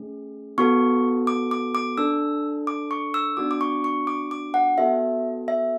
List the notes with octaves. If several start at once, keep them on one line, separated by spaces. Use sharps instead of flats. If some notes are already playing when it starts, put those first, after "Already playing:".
Already playing: A3 C#4 G#4
B3 F#4 A4 C#6
D6
D6
D6
D4 A4 E6
D6
C#6
E6
B3 D4 F#4 D6
D6
C#6
C#6
D6
D6
F#5
B3 F#4 A4 E5
E5